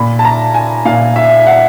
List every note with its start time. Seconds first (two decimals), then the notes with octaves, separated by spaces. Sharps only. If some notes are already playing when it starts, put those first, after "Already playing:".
Already playing: A#2 B5
0.19 A5
0.25 A#5
0.54 G#5
0.85 A#2 F5
1.16 E5
1.47 F#5